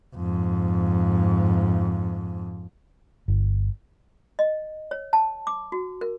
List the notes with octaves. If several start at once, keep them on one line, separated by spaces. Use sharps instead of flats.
F2 G#2
G1
D#5
C#5
A5
D6
F#4
A#4